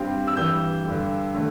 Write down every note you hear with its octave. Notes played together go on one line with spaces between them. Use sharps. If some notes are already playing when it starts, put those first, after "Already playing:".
Already playing: G2 G3 C4
E6
G2 E3 G3 G6
G2 D3 G3
D3 A3